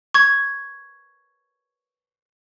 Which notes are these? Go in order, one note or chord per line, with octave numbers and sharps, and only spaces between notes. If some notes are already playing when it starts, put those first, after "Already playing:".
C#6 G#6